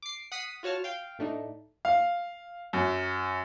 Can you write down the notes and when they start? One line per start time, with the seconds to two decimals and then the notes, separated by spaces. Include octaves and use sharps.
0.02 D6 C7
0.32 F#5 D#6 B6 C7 D#7
0.63 F4 F#4 C#5 A5 F6
0.84 F5 G5
1.19 A2 A3 D4 D#4
1.85 F5
2.73 F#2